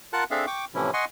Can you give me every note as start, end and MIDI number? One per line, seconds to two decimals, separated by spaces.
0.13 0.24 65
0.13 0.24 70
0.13 0.24 78
0.13 0.24 81
0.13 0.24 90
0.31 0.46 60
0.31 0.46 62
0.31 0.46 68
0.31 0.46 69
0.31 0.46 76
0.31 0.46 77
0.47 0.65 79
0.47 0.65 85
0.47 0.65 86
0.75 0.91 45
0.75 0.91 48
0.75 0.91 52
0.75 0.91 53
0.75 0.91 61
0.75 0.91 64
0.93 1.05 75
0.93 1.05 78
0.93 1.05 80
0.93 1.05 84
0.93 1.05 85